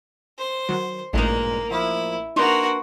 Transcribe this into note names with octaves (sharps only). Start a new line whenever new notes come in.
C5
D#3 F#3
A1 G2 A#2 G#3 A#3 D#4
F3 A#3 E4
A#3 D4 D#4 F#4 B4 C6